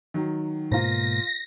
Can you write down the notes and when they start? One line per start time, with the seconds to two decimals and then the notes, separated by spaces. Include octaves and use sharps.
0.14 D#3 F#3
0.72 G#2 B2 A#3 F4 C5 A#6